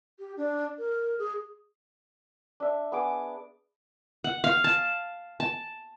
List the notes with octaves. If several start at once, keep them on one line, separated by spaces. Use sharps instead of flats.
G4
D4
A#4
G#4
D4 E5
B3 G#4 D6
F#5
F5
A5
A5